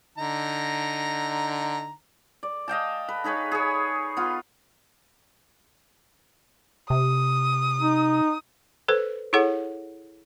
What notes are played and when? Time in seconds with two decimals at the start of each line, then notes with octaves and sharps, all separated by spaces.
0.18 D3 D#4 A#5
2.43 D5
2.68 D#5 F5 G5 A5
3.08 B4
3.24 D#4 G#4 B4 C#5
3.52 G#4 C#5
4.17 B3 F4
6.90 C3 D#6
7.81 D#4
8.88 A4 B4 C5
9.33 E4 G#4 A4 C#5 F#5